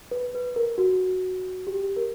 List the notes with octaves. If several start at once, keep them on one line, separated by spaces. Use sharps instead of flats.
B4
B4
A#4
F#4
G4
A#4